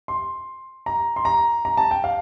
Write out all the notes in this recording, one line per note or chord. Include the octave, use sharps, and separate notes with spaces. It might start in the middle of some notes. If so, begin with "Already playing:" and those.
C6
A#5
C6
A#5
A#5
A5
G5
F5